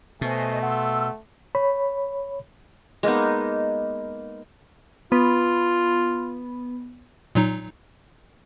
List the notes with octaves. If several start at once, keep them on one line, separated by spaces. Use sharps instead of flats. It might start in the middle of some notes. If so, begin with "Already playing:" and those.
B2 A3 C5 D#5 G#5
F#5 C6 E6
C#5 B5
G#3 A#3 B3 D#4
B3 F4
A#2 F#3 D#4